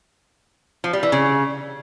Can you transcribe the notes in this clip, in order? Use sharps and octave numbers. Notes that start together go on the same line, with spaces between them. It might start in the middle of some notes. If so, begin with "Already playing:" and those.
F3
G3
E3
C#3